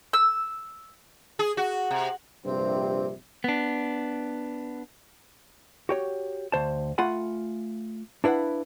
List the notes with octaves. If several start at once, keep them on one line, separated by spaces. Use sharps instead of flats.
E6
G#4
F#4
C3
A#1 G2 C3 C4
B3 D4
F#4 G4 C#5
D2 C5 A5
A3 F4 F#5 G#5 B5
D4 E4 B4 F5 F#5